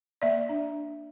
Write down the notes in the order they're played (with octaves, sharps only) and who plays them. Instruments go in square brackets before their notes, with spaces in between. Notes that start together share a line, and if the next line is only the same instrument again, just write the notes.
[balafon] A#3 D5 E5
D4